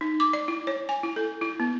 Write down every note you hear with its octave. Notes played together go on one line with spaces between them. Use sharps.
D#4
D6
D5
E4
C#5
G#5
E4
A4
E4
B3